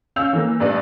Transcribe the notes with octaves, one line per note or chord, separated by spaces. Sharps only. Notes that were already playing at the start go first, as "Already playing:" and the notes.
C#4 F5 E6 G6 F7
E3 A#3
A1 G2 D4 B4 D5